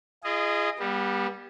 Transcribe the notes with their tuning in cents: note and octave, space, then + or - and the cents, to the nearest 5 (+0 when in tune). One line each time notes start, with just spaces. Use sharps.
F4 -45 G#4 +0 D#5 -15
G3 +10 B3 -30